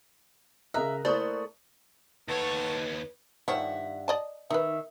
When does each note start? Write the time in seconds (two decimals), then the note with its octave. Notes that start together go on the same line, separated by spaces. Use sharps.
0.74 C#3 A#4 D#5 E5 A#5 F#6
1.05 A3 A#3 E4 A4 C5 D5 C#6 D#6
2.28 D#2 A3 B4 C#5 F#5 A5
3.48 G2 D#3 F3 C#5 E5 F#5
4.08 D5 D#5 A5
4.50 D#3 D#4 B4 E5